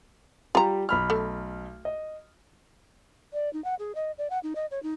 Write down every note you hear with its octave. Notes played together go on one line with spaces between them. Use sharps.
G3 F4 G4 A#5
B1 B5 F6
A3
D#5
D5
D#4
F#5
G#4
D#5
D5
F#5
D#4
D#5
C#5
D#4